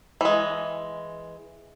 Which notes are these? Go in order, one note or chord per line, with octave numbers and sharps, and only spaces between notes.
E3 G#3